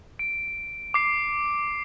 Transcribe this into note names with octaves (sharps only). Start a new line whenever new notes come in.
D7
D6 C7